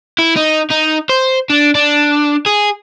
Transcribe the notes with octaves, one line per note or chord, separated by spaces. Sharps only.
E4
D#4
D#4
C5
D4
D4
G#4